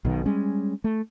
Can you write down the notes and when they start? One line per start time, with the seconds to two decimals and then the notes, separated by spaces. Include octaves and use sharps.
0.05 B1 B2 D#3
0.25 G3 G#3 C#4
0.84 A3